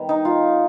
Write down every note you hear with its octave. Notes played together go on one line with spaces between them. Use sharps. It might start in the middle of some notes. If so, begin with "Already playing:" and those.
Already playing: D#3 G3 B3
D#4
F4